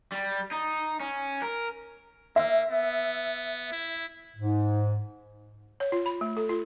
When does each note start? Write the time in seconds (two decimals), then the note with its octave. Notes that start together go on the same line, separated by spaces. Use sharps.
0.12 G3
0.51 D#4
1.00 C#4
1.42 A#4
2.36 A#3 E5 E6
2.71 B3
3.72 E4
4.37 G#2
5.80 C#5
5.92 F4
6.06 B5
6.21 A3
6.37 A4
6.49 F4